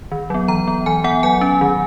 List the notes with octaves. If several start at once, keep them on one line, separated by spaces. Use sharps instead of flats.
D#3
F#3 B3
E3 A#5
B3
E3 G#5
B3 F#5
F#3 G#5
C#4
D#3